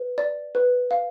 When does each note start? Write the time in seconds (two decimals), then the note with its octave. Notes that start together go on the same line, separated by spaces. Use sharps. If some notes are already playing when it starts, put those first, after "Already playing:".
Already playing: B4
0.18 D5
0.55 B4
0.91 F5